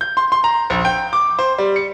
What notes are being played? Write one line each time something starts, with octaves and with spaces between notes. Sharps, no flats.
G6
C6
C6
A#5
A#1
G5
D6
C5
G3
C#7